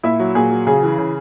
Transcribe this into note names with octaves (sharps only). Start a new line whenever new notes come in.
A#2 E4 E5
F#3
A#2 G#4
F#3
C#3 G#4
E3
C#3